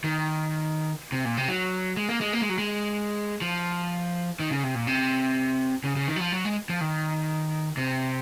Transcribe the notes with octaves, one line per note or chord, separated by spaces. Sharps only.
D#3
C3
A#2
C3
F#3
G#3
A#3
G#3
A#3
G#3
F#3
G#3
F3
D#3
C#3
C3
A#2
C3
C#3
C#3
D#3
F#3
F3
F#3
G#3
F3
D#3
C3